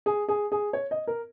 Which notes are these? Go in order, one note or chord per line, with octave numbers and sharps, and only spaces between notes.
G#4
G#4
G#4
C#5
D#5
A#4